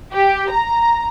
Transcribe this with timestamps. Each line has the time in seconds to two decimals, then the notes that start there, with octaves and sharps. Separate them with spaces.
0.14 G4
0.52 A#5